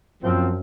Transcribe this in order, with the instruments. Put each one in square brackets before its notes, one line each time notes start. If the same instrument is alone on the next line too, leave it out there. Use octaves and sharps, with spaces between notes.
[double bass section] F#2 [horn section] A#2 F3 C4